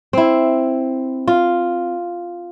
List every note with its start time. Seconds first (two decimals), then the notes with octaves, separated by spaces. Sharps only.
0.13 C4 E4
1.28 F4